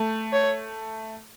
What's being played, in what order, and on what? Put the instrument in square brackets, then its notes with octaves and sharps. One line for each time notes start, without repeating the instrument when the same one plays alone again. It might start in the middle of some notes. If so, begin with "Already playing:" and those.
Already playing: [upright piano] A3
[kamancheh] C#5